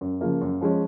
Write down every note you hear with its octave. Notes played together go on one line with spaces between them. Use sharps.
F#2
C#3 F3 A#3 F4
F#2
F3 G#3 C#4